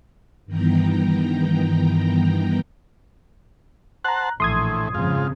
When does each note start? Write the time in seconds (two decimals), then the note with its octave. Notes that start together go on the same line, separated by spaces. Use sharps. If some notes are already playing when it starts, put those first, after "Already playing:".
0.46 G2 D#3 E3 B3 G5 A#5
4.05 C5 F#5 A5 A#5 F#6
4.40 A#1 A2 E3 C6 D#6 G#6
4.94 F2 G#2 C#3 F3 F4